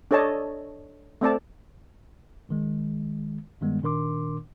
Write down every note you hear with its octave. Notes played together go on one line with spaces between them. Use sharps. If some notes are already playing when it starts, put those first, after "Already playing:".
D4 A4 C#5 D#5 A5
A3 C4 D5 A5
A#1 D#3 G#3
G2 D#3 G3 G#3 B3
A#2 D#3 D4 A#4 C6 D6